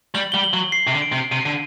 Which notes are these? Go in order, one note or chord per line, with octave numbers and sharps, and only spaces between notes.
G3 F#7
G3 G7
F#7
F#3
C7
C3
D3
D7
C3
C3 D#7
D3